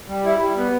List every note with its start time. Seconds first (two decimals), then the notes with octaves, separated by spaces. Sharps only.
0.08 G3
0.26 E4
0.41 G3
0.57 B3